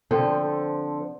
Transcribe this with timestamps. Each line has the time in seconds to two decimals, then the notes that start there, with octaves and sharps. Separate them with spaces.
0.11 D3 F3 C4 A4